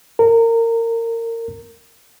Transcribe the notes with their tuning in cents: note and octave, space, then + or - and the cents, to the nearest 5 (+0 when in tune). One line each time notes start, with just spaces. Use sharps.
A#4 -25